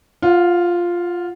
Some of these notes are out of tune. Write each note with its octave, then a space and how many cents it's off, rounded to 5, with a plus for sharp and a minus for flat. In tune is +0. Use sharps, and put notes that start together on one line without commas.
F4 +0 F#5 -30